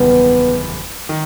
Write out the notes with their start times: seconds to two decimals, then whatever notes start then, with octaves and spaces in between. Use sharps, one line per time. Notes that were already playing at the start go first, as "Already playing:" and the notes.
Already playing: F#1 E2 D#3 G3 B3
1.09 D#3